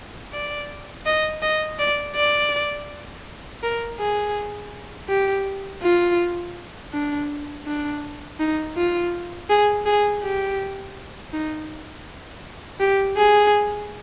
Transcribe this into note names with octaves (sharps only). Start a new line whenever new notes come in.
D5
D#5
D#5
D5
D5
A#4
G#4
G4
F4
D4
D4
D#4
F4
G#4
G#4
G4
D#4
G4
G#4